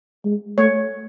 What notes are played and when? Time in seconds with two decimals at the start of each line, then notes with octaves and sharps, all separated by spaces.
0.25 G#3
0.58 A3 C#5